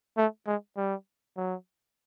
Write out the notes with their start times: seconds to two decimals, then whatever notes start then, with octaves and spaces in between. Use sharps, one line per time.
0.17 A3
0.47 G#3
0.77 G3
1.37 F#3